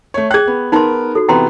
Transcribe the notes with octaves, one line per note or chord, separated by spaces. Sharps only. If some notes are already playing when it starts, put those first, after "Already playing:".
A3 C#5
G#4 G5 F#6 G#6
B3
B3 D#4 A#4 C6
F#4 A4
C3 E3 B3 G5 A#5 C6